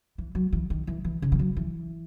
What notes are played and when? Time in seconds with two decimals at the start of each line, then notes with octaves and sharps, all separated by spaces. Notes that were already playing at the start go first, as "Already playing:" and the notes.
0.18 E3
0.35 F#3
0.53 E3
0.70 D#3
0.87 E3
1.05 E3
1.22 C#3
1.32 E3
1.39 F#3
1.57 E3